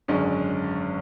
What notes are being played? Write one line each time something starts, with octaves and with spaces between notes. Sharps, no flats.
G#1 F#2 D3 G#3 C#4